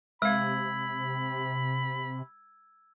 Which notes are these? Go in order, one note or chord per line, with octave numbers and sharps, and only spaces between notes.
C3 G#3 F5 B5 E6 G#6